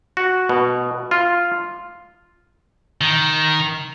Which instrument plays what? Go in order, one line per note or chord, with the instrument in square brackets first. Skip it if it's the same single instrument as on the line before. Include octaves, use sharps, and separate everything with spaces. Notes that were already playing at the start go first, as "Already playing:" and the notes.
[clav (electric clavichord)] F#4
B2
F4
[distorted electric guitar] D#3